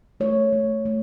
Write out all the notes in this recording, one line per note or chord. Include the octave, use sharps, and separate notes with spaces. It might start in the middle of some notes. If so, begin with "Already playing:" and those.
A3 C#5
A3
A3